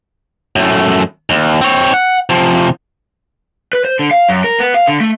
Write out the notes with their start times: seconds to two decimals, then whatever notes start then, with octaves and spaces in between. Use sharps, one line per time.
0.56 F#2 A3
1.30 D#2
1.61 C4 C#5
1.94 F#5
2.29 C3 F3
3.73 B4
3.85 C5
3.99 D3
4.11 F5
4.29 F#2
4.44 A#4
4.59 B3
4.74 F5
4.87 D3
5.00 A3